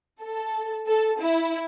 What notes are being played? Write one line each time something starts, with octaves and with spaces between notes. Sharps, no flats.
A4
A4
E4